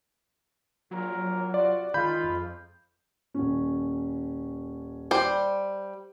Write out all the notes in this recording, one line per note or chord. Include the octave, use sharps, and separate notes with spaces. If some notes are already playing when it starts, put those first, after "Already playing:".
A#1 A#2 F#3 A#4
C3 F4 F#4 D5
D#3 G#3 F4 B5 G6
F2
D#1 C#4
G3 C5